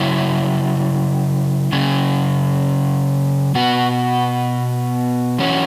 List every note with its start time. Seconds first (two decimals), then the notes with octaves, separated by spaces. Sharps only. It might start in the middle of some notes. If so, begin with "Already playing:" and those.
Already playing: C#3 F#3 E4
1.72 C#3 F#3 C#4
3.55 B2 B3 F#4
5.38 E3 C#4 F#4